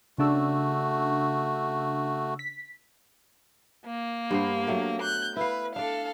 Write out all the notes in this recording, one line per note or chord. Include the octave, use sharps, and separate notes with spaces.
C#3 A3 D4 F#4 E6
B6
A#3
G2 B3 C5
F#3 A3 G5
F#6 G6
E4 B4 F5
D4 A4 D5 F5